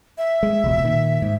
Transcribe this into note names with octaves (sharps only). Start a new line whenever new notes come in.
E5
G#3
E1 C#2 B2
A#2 D#3
G#2